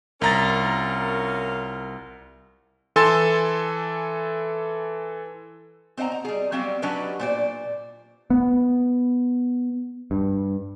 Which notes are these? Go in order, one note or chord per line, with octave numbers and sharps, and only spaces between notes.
C2 C#4 F4 A#4 A#5 A6
E3 A4 G#5 C6 E6 A6
C4 C5 D#5 F#5 A#5
A#5
G3 G#4
F#3 G3 C4 G4 F5
F#3 C#4 D4 G4 B4 D#5
A#2 C5 D5
B3
G2